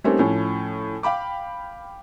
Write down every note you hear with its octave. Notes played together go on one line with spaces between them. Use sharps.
G3 A3 A#3 C4 C#4 D#4
A2 F3 C#4
F5 G5 B5 D6